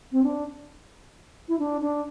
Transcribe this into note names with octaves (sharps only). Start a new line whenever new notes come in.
C4
D4
E4
D4
D4